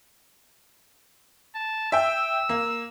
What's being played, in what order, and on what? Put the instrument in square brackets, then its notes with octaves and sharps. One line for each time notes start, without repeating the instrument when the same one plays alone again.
[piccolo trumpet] A5
[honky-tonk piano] E5 G5 [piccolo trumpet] E6
[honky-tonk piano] A#3